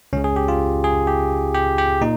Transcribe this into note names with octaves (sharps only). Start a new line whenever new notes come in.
C#2 C#3 C#4
G#4
G4
F4
G#4
G4
G4
G4
A#2 D#4